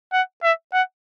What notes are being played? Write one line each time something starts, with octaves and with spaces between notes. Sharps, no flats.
F#5
E5
F#5